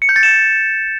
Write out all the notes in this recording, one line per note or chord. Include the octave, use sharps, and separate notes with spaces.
C#7
G6
A6
E7